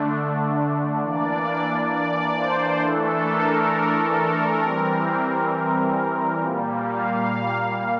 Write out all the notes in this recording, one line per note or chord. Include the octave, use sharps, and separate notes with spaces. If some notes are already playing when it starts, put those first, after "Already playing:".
Already playing: D3 A3 D4
E3 A#3 D4 D5
D5
C5
E3 A3 D4 A4
A#4
A4
A#4
E3 G3 C4
A#2 G3 A#3
F5